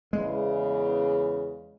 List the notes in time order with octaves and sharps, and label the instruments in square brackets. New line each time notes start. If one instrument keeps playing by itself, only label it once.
[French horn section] E2 C#3 [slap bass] G#3